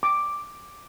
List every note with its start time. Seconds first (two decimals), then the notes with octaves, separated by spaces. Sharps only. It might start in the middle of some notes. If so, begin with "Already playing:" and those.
0.03 D6